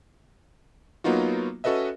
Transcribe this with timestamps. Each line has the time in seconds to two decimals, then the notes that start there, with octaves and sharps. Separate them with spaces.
1.04 F#3 A#3 B3 D#4 F4 F#4
1.64 C#4 F#4 A4 B4 D#5 E5